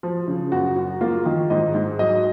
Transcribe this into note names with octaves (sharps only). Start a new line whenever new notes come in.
F3
C#3
F#2 F#4
F#2
A#3 F4
D#3
G#2 D#5
G#2
F#3 D#5